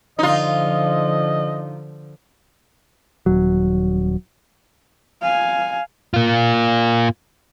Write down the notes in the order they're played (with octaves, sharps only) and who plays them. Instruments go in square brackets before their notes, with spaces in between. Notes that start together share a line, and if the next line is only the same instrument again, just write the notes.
[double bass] D3 F3 [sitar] D#4 F4 [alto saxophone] D#5
[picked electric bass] D#1 F#3
[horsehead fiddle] F5 G#5
[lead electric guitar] A#3 F4